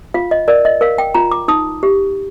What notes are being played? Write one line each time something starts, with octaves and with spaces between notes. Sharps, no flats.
F4 F5
D#5
A#4 D5
D#5
A#4 F5
G5
F4 A#5
D6
D#4 D#6
G4